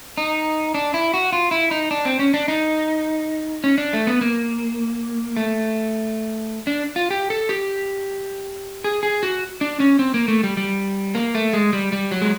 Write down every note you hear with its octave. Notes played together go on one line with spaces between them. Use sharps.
D#4
D4
E4
F#4
F4
E4
D#4
D4
C4
C#4
D4
D#4
C#4
D4
A3
B3
A#3
A3
D4
F4
G4
A4
G4
G#4
G#4
F#4
D4
C#4
C4
A#3
A3
G3
G3
A#3
A3
G#3
G3
G3
F#3
G#3